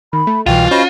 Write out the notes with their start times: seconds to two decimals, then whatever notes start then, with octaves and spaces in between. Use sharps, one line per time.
0.13 D#3 B5
0.27 A3
0.46 C2 B2 E3 F4 F5 G5
0.71 C#4 F#4 C5 D#5 B5